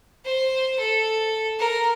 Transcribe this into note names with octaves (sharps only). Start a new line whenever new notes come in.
C5
A4
A#4